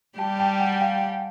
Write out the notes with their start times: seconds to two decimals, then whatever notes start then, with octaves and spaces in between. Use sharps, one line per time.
0.18 G3 G4 G5 A5
0.40 G5 A5
0.59 F#5 G#5
0.80 F5 G5